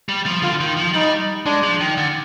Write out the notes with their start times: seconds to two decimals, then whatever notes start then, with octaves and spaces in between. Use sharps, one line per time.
0.09 G3
0.26 F3
0.42 D3 F4
0.60 D#3
0.77 F3
0.94 G3 D#4
1.46 G#3 D4
1.63 F3
1.81 D#3
1.97 D3